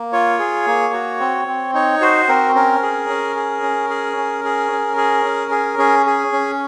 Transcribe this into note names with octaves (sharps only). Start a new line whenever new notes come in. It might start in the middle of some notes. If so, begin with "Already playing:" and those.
Already playing: A#3
F4 C#5
G#4
A#3
F#4
C4
C4
D#4 C#5
F#4 C5
C4 A#4
C#4 A#4
G#4
C#4
G#4
C#4
G#4
C#4
G#4
C#4
G#4
C#4
G#4
C#4 G#4
G#4
C#4